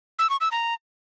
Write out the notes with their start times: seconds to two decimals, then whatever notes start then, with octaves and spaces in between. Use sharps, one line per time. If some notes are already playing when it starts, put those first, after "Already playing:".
0.19 E6
0.30 C#6
0.41 E6
0.52 A#5